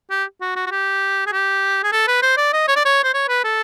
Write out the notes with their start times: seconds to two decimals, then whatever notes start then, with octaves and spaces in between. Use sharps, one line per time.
0.11 G4
0.41 F#4
0.56 F#4
0.66 F#4
0.71 G4
1.27 G#4
1.32 G4
1.83 G#4
1.92 A4
2.07 B4
2.22 C5
2.37 D5
2.53 D#5
2.68 C#5
2.76 D5
2.85 C#5
3.04 C5
3.14 C#5
3.28 B4
3.44 A4